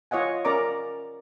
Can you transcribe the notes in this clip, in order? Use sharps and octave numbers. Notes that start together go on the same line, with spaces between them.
F4 C#5 D#5 F#5 G#5
C#4 A#4 D5 A#5 D6